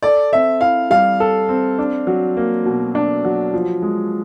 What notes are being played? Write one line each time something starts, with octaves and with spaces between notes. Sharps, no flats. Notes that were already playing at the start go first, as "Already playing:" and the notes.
A4 D5
C4 E5
E4 F5
G3 F5
A4
C4
D4
F#3
A#3
B2
D4
F#3
F3
G#3